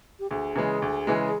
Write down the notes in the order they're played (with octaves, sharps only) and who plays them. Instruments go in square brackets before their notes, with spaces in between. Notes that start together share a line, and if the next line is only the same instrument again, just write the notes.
[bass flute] G4
[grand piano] D2 [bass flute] G#4
[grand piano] C#3 E3 G#3
D2
C#3 E3 G#3